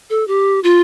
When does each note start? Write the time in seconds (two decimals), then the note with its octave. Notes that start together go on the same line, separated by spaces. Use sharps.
0.10 A4
0.28 G4
0.64 F4